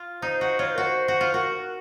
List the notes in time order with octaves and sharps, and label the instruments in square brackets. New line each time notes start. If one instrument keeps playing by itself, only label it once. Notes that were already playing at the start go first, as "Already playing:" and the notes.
Already playing: [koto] F4
[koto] D#4 [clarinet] C5
[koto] F#4
[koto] F4 [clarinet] C#5
[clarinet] C5
A#4
[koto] F#4 [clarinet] C5
[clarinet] C5
[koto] F#4
F4
[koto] F#4 [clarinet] A#4